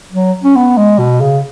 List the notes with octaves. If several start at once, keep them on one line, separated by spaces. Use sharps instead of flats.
F#3
C#4
B3
G#3
B2
C#3